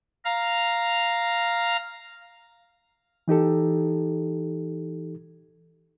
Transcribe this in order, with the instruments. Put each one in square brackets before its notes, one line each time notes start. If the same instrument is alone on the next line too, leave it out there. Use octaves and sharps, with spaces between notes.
[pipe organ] F5 A#5
[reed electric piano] E3 D#4 G4 A4